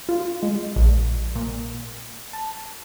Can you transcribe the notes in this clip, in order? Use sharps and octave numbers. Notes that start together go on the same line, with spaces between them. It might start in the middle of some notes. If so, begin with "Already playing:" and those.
F4
G#3
A#1
A#2
A5